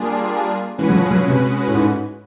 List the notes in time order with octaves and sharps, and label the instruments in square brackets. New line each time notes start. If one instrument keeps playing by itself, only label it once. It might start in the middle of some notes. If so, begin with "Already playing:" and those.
Already playing: [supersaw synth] G3 A#3 D4 F4 G#4
[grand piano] E3 [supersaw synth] G#3 C#4 F#4 B4
[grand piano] F#3
F3
F#3
C3
A2
G#2